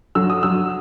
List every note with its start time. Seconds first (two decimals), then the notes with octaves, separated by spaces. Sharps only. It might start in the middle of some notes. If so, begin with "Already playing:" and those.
0.15 F#3 E6
0.30 D#6
0.43 F#3 E6